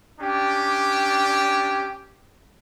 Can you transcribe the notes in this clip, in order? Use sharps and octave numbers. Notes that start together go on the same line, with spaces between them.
C#4 D4 G4